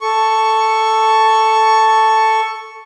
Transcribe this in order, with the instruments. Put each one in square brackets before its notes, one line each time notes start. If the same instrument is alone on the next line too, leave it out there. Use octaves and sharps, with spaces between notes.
[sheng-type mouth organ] A4 C#6